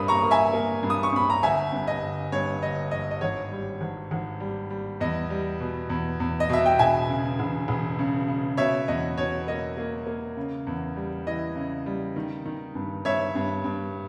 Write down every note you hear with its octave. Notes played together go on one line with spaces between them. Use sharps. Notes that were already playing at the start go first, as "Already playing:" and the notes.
Already playing: G2 A#3 B5 D#6
A#5 C#6
A#3
E5 G#5
A#3
G2
D#6
C#6
G2 B5
A#5
G1 E5 G#5
G2
D#5
G1
G2 C#5
G1 D#5
G1 D#5
D#5
G#1 C#5
G3
G#1
G#1
G3
G3
E2 D#5
G3
B2
E2
E2
D#5
B2 E5
G5
E1 E5 G#5
C#3
E1
E1
C#3
C#3
B2 C#5 E5
E2 D#5
B2 C#5
A#3 D#5
A#3
A#3
C#3
E2
G3
E3 D#5
C#3
G3
D#3
D#3
G2
G2 C#5 E5
G2
G2